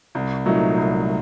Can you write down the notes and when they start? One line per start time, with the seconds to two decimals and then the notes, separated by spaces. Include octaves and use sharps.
0.15 C2
0.46 A#2 F#3 A3 D#4
0.77 C2